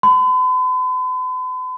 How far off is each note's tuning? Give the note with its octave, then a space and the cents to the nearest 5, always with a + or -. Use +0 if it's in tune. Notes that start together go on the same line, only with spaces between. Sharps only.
B5 +45